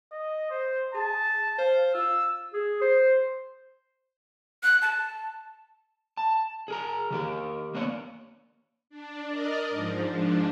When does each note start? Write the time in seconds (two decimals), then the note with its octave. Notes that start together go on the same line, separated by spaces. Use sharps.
0.12 D#5
0.50 C5
0.94 G#4 A5
1.59 C5 F5
1.95 F4 E6
2.53 G#4
2.81 C5
4.63 F#6
4.82 A5
6.17 A5
6.68 G#4 A#4 A#5
7.10 D#3 G4 A#4
7.75 A#3 B3 D4 C#5
8.90 D4
9.28 A#4 D5 D#5
9.70 G#2 F3
10.09 G#2 F3 D4